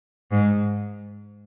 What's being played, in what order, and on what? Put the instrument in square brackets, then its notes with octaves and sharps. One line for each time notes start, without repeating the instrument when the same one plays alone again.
[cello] G#2